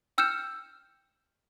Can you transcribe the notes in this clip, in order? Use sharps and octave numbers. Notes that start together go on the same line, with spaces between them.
G5 E6 F6 G6 C#7 E7